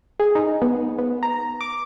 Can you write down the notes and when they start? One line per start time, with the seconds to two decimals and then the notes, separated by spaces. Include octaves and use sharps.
0.20 G#4
0.35 D#4
0.62 B3
0.98 B3
1.23 A#5
1.61 D6